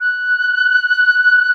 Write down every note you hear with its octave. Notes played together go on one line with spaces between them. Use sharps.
F#6